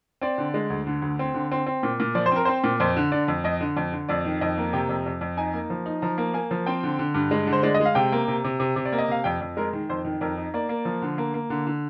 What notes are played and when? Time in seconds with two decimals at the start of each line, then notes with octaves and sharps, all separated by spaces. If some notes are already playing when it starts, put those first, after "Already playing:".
0.21 C4 D5
0.38 D3
0.54 G#3
0.70 D2
0.87 D3
1.02 D2
1.19 C4
1.34 D3
1.52 C4
1.66 C4
1.83 A#2
2.00 A#2
2.15 F3 D5
2.26 C5
2.32 C4 A#4
2.45 C4 C5
2.64 A#2
2.80 F2 C5
2.97 D3
3.12 D3 D5
3.28 F2
3.44 F2 D#5
3.61 D3
3.77 F2
3.92 D3
4.09 F2 D5
4.25 D#3
4.41 F2 D#5
4.58 A#3
4.73 C3 G5
4.89 F2
5.06 F2
5.21 F2
5.37 D#4 G#5
5.54 A#3
5.70 F3
5.86 D#4
6.02 F3 A#5
6.18 A#3
6.34 A#3 G#5
6.51 F3
6.66 C4 G5
6.83 D3
6.99 D3
7.14 G2
7.31 G#3
7.47 D3
7.53 C5
7.63 G#3 D5
7.75 D#5
7.80 G#3
7.85 F5
7.95 C3 G5
8.12 A#3
8.28 C3
8.44 C3
8.60 C3
8.76 C3
8.85 D5
8.92 A#3
8.98 D#5
9.08 C3 F5
9.24 F2 G5
9.41 F2
9.57 G#3 A#4
9.73 D#3
9.89 F2 C5
10.05 D#3
10.21 F2 A#4
10.38 D#4
10.54 A#3 D5
10.69 A#3
10.85 F3
11.02 D3
11.18 A#3
11.34 A#3
11.50 D3
11.67 D3